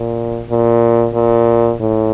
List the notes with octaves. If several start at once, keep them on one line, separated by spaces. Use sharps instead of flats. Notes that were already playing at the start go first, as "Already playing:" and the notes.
Already playing: A#2
A#2
A#2
A2